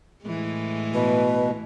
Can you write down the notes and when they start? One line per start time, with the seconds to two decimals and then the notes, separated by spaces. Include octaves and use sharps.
0.25 A2 E3 G#3
0.94 B2 B4